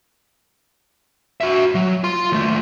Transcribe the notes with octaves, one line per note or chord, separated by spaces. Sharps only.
F#4 E5
F#3
F4 C6
D#2 A3